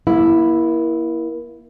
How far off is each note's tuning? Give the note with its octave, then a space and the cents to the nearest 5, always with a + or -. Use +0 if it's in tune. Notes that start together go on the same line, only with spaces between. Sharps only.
A#3 +30 E4 +0